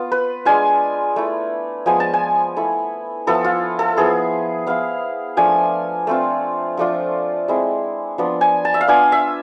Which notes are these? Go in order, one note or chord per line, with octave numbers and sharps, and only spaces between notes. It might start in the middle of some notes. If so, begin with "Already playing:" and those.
Already playing: B3 F4
B4
G#3 D4 F4 G#5
A3 E4
F3 G#3 B3 G#5
A5
G#5
A3 E4
F3 B3 E4 A4
F4
A4
F3 B3 E4 G#4
B3 E4 F5
F3 A3 D4 G#5
A3 C4 F4
F3 A3 D4 F4
G#3 C4 E4
F3 B3 D4 F4
G#5
A5
E5
F5
B3 D4 F4 G#5
E5